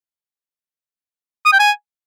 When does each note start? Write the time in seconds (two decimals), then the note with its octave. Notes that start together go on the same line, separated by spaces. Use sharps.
1.45 D#6
1.52 G5
1.60 G#5